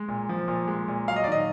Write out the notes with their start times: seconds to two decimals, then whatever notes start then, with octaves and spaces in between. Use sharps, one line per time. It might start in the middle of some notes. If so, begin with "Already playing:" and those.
Already playing: G#3
0.08 A#2
0.29 F3
0.48 A#2
0.68 G#3
0.88 A#2
1.08 F#3 F5
1.16 D#5
1.24 D5
1.28 D#3 D#5